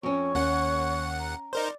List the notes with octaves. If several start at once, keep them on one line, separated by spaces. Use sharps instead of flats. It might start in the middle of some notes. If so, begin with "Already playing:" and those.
F2 C#4 C#5 C#6
D#2 C#4 F#5
A#5
D#4 A#4 C5 D5